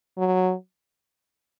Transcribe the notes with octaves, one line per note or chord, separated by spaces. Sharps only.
F#3